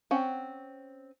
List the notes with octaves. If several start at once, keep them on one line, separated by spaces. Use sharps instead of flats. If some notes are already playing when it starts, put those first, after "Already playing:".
C4 C#4 F#5